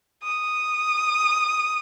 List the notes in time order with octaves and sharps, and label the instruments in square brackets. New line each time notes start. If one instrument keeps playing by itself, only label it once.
[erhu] D#6